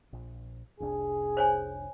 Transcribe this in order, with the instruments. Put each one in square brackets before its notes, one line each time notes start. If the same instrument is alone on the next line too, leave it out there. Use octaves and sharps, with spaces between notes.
[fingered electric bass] A#1
[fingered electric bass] F1 C2 D4 [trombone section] G#4
[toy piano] C5 C#5 G#5